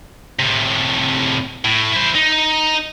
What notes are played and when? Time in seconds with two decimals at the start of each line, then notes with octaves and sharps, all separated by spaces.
0.39 A2 C3
1.65 A2
1.93 E4 C5
2.15 D#4